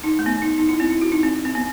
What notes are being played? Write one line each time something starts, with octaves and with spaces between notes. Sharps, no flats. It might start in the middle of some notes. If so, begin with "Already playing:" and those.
D#4
A3
B3
D#4
D#4
E4
C4
E4
F#4
D#4
C4
C4
B3